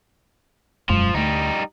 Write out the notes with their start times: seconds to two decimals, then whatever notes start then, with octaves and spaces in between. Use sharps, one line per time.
0.89 E1 F#2 F3 G#3
1.15 D2 G3 A3 D#4